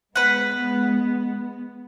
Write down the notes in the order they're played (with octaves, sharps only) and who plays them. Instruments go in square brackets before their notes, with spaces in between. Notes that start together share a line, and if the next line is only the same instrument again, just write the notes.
[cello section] G#3 B3 [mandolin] B4 F#5